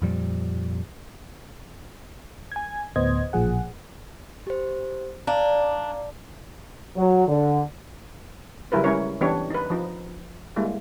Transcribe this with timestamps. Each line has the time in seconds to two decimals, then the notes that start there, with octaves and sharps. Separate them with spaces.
0.02 F2 A#2 F3 G3
2.52 G#5 G#6
2.96 D2 A2 B3 C5 D#5 G#6
3.33 A1 A#2 F3 G#4 F#5
4.47 G4 C5
5.27 D4 D5 F5 A#5
6.97 F#3
7.27 D3
8.72 C#3 F#3 G3 E4 A#4 B4
8.84 G3 G#3 C#4 E4 A#4 C#5
9.21 E3 B3 C#4 D4 G4 C#5
9.50 D#4 B4
9.70 F3 D#4
10.56 G3 G#3 A#3 E4